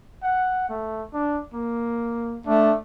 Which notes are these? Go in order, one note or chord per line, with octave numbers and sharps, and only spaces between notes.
F#5
A3
D4
A#3
A3 D4